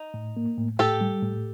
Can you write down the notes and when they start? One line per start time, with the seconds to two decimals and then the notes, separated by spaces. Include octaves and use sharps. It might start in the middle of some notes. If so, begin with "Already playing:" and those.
Already playing: D#4
0.14 A2
0.37 A#3
0.58 A2
0.79 A2 G4 A4
1.01 G3
1.22 A2